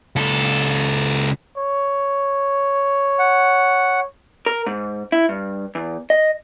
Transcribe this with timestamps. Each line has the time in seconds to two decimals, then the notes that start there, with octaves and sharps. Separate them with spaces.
0.16 C#2 A4
1.57 C#5
3.19 F#5
4.46 A#4
4.66 G#2
5.12 E4
5.29 G2
5.75 E2
6.10 D#5